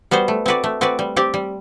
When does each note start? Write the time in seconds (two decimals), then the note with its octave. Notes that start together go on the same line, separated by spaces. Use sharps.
0.11 G3 B3 F#4 C5
0.28 A3
0.46 C4 F#4 B4 D5
0.64 A3
0.81 C4 F#4 B4 D5
0.99 G3
1.16 C4 G4 D5
1.34 G3